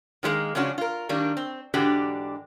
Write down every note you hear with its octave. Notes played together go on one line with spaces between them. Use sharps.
D#3 F#3 G#3 A#3
C#3 F3 G#3 C#4 D4 F#4
F4 A#4
D#3 G3 A#3 D4
C4
G#2 D3 E3 D4 F#4 G4